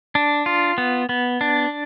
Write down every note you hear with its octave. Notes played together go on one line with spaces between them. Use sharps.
D4
F4
B3
B3
D4